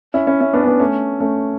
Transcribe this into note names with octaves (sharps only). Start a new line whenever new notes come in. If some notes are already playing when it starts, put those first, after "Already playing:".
C#4 E4
C#4 E4
C#4 E4
B3 D4
C#4
B3 D4
A3 C#4
A3 C#4